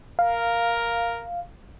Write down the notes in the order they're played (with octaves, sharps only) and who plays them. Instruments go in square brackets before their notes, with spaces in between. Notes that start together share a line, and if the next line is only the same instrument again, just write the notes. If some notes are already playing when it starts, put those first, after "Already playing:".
[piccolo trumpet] A#4 [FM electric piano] F5